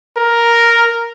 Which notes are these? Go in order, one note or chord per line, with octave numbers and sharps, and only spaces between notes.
A#4